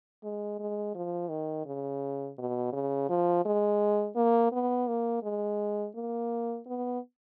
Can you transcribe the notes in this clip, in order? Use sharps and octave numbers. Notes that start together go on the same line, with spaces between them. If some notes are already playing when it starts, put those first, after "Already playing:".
G#3
G#3
F3
D#3
C#3
B2
C#3
F3
G#3
A#3
B3
A#3
G#3
A#3
B3